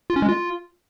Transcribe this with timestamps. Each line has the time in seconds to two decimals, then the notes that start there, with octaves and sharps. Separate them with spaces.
0.10 F4
0.16 C#4
0.22 G#3
0.29 F4